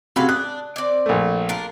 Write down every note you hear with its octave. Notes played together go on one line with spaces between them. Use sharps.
C3 F#4 G#4 A4 F5 B5
D4 D#6 F#6
C4 D5
A#1 A3
D4 F4 A#4